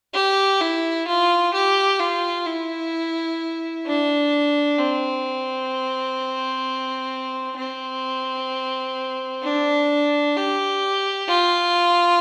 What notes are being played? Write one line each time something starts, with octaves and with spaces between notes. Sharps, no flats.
G4
E4
F4
G4
F4
E4
D4
C4
C4
D4
G4
F4